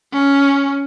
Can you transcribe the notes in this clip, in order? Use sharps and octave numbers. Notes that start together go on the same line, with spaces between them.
C#4